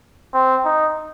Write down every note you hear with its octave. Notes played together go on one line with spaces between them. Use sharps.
C4
D#4